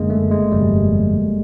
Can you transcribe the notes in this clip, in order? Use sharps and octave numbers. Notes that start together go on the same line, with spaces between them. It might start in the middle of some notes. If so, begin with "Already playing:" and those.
Already playing: F#1 F#2 D3 G#3 A#3
A3
G#3
G1 F2 C3 G3